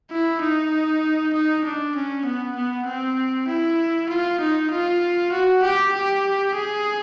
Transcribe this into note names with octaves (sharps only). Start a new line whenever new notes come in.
E4
D#4
D#4
D4
C#4
B3
B3
C4
E4
F4
D#4
F4
F#4
G4
G4
G#4